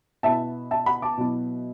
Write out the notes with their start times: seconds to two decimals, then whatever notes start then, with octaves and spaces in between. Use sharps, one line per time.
0.23 B2 B3 E4 E5 A5
0.71 E5 A5
0.86 F#5 B5
1.02 A5 D6
1.18 B2 F#3 B3 E4